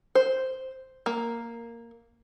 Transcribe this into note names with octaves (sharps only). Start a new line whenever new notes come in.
C5
A#3